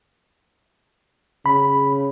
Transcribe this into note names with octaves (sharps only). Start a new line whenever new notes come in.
C#3 B5